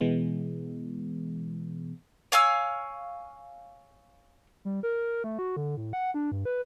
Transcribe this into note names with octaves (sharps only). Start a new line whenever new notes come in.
B2 E3 G#3 B3
C#5 F5 G#5 E6
G3
A#4
A3
F#4
D3
A2
F#5
D4
G2
B4